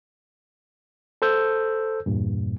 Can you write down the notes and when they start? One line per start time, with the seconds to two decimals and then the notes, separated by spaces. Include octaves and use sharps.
1.22 A4 C5 E6 G6
2.06 E2 G2 A#2